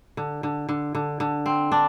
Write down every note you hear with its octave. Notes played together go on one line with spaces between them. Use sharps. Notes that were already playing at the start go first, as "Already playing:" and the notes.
D3
D3
D3
D3
D3
C4
D4